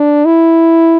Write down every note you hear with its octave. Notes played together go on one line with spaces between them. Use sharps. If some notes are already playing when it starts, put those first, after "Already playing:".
Already playing: D4
E4